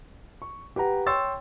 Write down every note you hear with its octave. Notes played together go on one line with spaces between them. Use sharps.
C#6
G4 B4 F#5 A#5
C#5 G5 C6 C#6 E6 A6